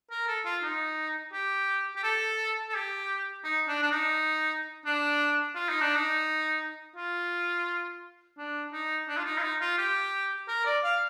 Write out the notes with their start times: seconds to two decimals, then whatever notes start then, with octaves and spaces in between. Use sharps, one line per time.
0.10 A#4
0.28 A4
0.45 F4
0.63 D#4
1.33 G4
1.96 G4
2.04 A4
2.69 A4
2.75 G4
3.44 D#4
3.68 D4
3.82 D4
3.91 D#4
4.86 D4
5.55 F4
5.69 D#4
5.81 D4
5.96 D#4
6.96 F4
8.38 D4
8.73 D#4
9.08 D4
9.17 F4
9.25 D#4
9.38 F4
9.43 D#4
9.61 F4
9.78 G4
10.48 A#4
10.65 D5
10.84 F5